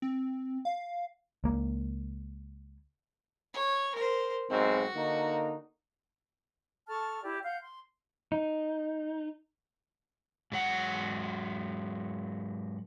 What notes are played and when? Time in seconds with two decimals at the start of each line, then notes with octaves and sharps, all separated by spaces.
0.02 C4
0.65 F5
1.44 C#2 A#3
3.54 C#5
3.95 A#4 C5
4.50 B1 G#2 C4 F#4
4.96 D3 A#3 D#4
6.88 A4 A5 C#6 F6
7.23 E4 G4 D5
7.44 F5 F#5 G6
7.60 C6
8.32 D#4
10.52 G#2 F#3 F#5